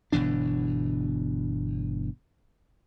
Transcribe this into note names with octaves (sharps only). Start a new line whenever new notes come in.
G1 B2 E3 D4